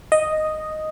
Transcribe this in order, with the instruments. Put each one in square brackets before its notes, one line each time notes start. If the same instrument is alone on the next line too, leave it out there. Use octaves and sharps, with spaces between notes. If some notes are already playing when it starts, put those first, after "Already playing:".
[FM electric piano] D#5